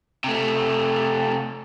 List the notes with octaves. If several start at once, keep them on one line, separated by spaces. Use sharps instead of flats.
C3 A3